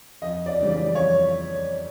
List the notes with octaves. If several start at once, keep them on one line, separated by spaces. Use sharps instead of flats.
F2 D#5
D5
C#3 E3 G3
D5
F2 C#5